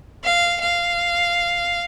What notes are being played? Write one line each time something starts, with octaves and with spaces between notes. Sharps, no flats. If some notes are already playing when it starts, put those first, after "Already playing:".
F5
F5